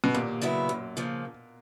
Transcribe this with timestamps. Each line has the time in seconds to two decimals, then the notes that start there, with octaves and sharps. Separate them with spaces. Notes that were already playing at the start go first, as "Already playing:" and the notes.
0.04 B2
0.14 D#2 A#2
0.42 C#3 F#3 B3 E4
0.69 F#2
0.97 C#3 F3 A#3